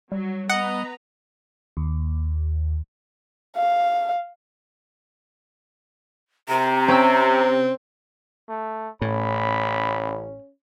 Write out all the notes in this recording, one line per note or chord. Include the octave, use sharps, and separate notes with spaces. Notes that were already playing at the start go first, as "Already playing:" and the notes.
F#3 G3
B3 B4 D#5 F#5 A#5
D#2
F5
C3 A#5
C4 C#4 G5 E6
A3
A1 A2 C#4 B5